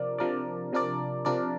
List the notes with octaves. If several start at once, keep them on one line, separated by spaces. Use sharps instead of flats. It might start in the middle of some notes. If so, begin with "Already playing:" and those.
Already playing: C3 F3 D4 A#4 D5
C3 F3 D4 A#4 D5
C3 F3 D4 A#4 D5
C3 F3 D4 A#4 D5